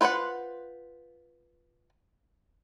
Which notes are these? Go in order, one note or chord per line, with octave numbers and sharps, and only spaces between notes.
F4 B4 C5 D5 F#5